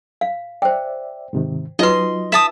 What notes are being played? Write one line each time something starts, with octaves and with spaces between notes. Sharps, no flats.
F5
C5 D5 E5 G5
G#2 C3 D#3
F#3 D#4 F4 B4 D#5 C6
E5 A5 D#6